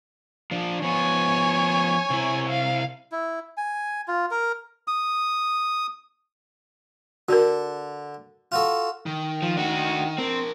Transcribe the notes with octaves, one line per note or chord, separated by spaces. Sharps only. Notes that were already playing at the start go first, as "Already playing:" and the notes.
F3 D4
F3 B3 C#5 G#5
C3 E4
F5
E4
G#5
F4
A#4
D#6
D3 F#4 A#4
F4 F#4 A4
D#3
F3
D4 F#4
C4 D4 A#4